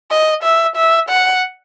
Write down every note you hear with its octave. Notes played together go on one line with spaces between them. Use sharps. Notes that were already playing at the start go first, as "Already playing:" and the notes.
D#5
E5
E5
F#5